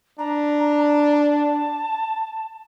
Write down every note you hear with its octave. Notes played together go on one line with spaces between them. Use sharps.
D4 A#5
A5